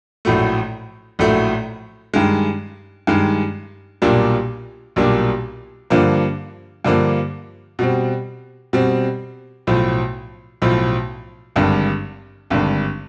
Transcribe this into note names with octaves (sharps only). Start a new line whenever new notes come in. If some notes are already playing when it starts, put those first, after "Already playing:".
A#1 A2 F#3 A3
A#1 A2 F#3 A3
G2 D#3 G#3
G2 D#3 G#3
B1 A#2 G3 A#3 D4
B1 A#2 G3 A#3 D4
G2 D3 F3 A#3
G2 D3 F3 A#3
B2 G3 C4
B2 G3 C4
B1 A2 F3
B1 A2 F3
G#1 G2 D3
G#1 G2 D3